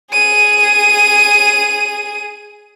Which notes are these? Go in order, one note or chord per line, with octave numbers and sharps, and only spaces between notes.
G#4 D#7